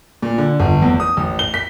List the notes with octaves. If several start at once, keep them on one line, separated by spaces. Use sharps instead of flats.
A#2
D3
G1
E2
D#6
A1
G7
B6